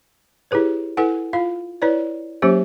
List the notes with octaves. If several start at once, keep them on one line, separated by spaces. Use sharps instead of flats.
E4 G4 G#4 B4 C#5
E4 A4 B4 F#5 G#5
F4 F5
E4 B4 C#5 D5
F#3 A#3 C#4 G4 C5